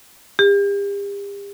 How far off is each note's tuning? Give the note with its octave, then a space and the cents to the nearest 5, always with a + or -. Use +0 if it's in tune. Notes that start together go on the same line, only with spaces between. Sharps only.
G4 +40